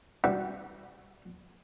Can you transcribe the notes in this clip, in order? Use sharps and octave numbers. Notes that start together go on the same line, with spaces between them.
G3 E4 F#4 B4